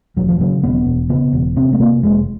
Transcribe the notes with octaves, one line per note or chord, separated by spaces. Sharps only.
E1 F#3
F3
C#3 F#3
E1 B3
E1
C#3 B3
E1
C3 C4
A3
C3 A#3
F1 G#3